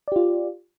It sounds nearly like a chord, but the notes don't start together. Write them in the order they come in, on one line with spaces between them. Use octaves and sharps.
D5 G4 F4